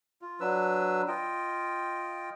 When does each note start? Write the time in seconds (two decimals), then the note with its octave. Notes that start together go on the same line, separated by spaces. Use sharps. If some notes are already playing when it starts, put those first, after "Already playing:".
0.22 F4
0.40 F#3 D4 B4 E6
1.08 F4 D#5 G5